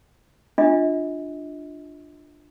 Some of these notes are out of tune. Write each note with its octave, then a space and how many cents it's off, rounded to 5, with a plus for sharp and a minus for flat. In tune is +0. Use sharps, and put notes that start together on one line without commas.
D4 +15 F4 +0 D#5 +40